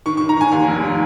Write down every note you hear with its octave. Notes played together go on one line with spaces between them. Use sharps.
D#3 C#6
D#3 C#6
A#5
D#3 G#5
D#2 G#5
F1
D#3